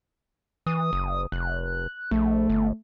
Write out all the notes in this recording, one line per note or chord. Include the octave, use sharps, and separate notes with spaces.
E3 D#6
F#1
F1 F#6
A#1 A3
G1